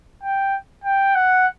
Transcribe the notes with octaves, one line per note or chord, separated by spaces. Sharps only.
G5
G5
F#5